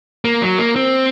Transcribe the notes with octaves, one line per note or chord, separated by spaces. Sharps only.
A#3
F#3
A#3
C4